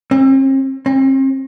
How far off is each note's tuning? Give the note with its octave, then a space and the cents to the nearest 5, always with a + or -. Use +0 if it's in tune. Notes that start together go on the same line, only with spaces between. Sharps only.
C4 +45
C4 +40